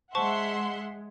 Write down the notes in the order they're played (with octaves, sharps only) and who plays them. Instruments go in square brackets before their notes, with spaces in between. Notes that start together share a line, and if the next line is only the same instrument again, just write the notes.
[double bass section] G#3 [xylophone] C5 A5 C#6 [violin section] E5 F#5 C6